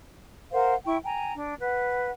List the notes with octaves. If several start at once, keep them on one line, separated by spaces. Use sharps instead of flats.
A#4 C5 F5 F#5
E4 G5 C#6
G5 G#5 A#5
D4
B4 F#5